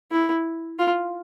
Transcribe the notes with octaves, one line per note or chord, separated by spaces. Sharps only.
E4
F4